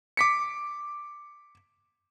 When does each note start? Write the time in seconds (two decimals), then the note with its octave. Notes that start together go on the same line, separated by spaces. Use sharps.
0.17 D6 B6 C#7